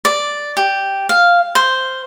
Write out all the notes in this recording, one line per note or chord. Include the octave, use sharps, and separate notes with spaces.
D5
G4
F5
C5